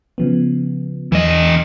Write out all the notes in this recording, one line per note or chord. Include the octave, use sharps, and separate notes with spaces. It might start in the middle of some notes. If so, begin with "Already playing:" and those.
C#3 F3 B3
E2 E3 D#5